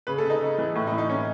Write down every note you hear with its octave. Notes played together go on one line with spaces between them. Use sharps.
C#3 B4
A4
C#3
D#4
C#3
E3
A2
D#4
E3
D#4
A2 C#4